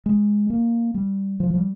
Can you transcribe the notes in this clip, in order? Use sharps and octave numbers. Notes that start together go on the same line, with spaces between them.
G#3
A#3
G3
F3
F3
G3